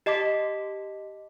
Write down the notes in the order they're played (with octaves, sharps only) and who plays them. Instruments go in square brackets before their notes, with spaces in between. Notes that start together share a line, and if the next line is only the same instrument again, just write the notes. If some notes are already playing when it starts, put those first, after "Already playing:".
[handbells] G4 D#5 A5 D6 B6